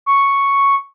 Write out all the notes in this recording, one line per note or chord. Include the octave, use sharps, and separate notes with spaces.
C#6